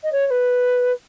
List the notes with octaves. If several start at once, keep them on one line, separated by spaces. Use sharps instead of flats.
D#5
C#5
C#5
B4